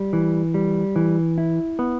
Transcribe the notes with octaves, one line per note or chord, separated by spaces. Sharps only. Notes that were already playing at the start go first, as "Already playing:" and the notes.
Already playing: G3
E3
G3
E3
E4
B3